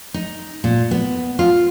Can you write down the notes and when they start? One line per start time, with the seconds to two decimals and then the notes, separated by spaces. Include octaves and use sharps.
0.14 D#4
0.64 A#2
0.91 B3
1.39 F4